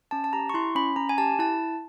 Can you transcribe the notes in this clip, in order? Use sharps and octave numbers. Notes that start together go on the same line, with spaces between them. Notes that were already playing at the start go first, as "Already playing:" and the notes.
C#4 A5
A5
G4 A#5
C#6
E4 C6
C#4 B5
C#4 A#5
G#5
G4 A5
E4 A5